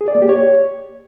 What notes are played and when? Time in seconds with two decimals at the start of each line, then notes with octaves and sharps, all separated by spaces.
0.01 G#4
0.08 D5
0.15 A#3
0.22 G4
0.29 C#5